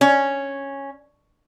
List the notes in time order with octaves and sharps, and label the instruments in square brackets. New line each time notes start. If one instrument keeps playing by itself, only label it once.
[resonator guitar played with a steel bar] C#4